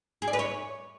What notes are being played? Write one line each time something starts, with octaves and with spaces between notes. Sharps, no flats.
G#4
D5
B4
C#5